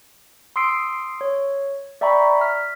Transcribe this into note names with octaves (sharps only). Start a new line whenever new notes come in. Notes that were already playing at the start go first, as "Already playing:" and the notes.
C6 D#6 E6 C7 D7
C#5
D5 E5 G5 A#5 B5 C#6
F6 B6